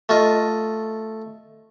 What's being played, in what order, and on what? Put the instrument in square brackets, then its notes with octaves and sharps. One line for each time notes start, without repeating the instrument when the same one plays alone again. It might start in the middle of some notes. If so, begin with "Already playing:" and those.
[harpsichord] A3 F4 D#5